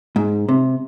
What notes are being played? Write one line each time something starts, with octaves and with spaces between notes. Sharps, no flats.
G#2
C3